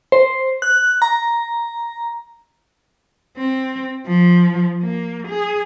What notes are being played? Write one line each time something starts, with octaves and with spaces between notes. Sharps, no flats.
C5
F#6
A#5
C4
F3
A#3
G#4